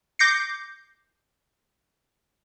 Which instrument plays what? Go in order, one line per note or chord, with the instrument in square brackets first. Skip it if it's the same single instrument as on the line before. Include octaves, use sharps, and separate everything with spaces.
[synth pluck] D6 G6 A#6 C7 C#7